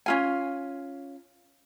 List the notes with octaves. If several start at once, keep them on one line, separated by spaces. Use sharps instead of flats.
C#4 F4 G#5